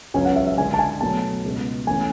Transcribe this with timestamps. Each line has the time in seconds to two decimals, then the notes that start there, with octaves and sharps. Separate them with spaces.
0.14 C#2 C#3 F#3 C#4 G#5
0.25 F#5
0.36 E5
0.47 E5
0.57 D3 G#3 D4 G#5
0.74 A5
0.79 G#5
1.01 B2 F#3 A3 A5
1.44 C#2 B2 G#3
1.87 E3 A3 C#4 G#5